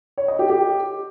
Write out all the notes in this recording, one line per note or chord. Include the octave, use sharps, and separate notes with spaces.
C#5
D#5
G4
G4